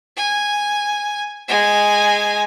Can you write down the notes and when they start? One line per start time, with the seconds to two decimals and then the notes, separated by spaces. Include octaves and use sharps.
0.17 G#5
1.48 G#3 G#5